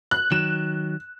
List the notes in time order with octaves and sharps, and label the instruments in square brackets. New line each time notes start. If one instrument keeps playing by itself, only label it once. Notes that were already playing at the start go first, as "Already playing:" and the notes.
[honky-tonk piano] F#6
[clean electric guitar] D#3 F#3 [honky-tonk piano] E7